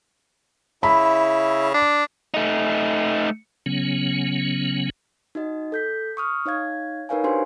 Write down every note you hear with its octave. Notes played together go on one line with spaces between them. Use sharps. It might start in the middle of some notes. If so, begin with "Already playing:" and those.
C#3 E4 E5 B5
D4
A3 D#4
C#3 F#3 B3 C#4
D#4 F#4 D#5
A4 G6 B6
C#6 D#6 F6
D#4 C#5 F5 G#6
D#4 A#4 B4 C#5 F5 G#5
D4 F#4 G4 C5 G#5 C6